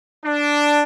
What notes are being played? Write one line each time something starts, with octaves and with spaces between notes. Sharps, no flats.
D4